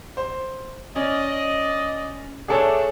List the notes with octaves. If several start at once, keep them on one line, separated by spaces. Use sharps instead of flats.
C5
C#4 D5 D#5
A3 D4 G#4 A4 C#5